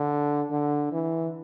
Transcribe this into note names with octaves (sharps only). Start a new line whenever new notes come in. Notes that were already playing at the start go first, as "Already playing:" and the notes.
Already playing: D3
D3
E3